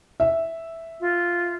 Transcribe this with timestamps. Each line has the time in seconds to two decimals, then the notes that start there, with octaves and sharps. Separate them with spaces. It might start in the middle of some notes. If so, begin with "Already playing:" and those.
0.20 E5
1.00 F4